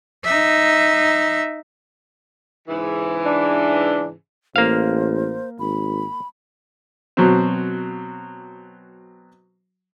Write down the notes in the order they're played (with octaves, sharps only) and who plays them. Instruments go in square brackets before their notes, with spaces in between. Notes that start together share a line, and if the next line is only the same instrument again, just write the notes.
[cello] D#4 E5
[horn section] G#2 C#3 E3
[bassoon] D4
[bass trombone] A1 [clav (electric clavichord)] A#3 F5 [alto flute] C5
[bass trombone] G#1 [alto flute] B5
[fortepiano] B2 F#3 C4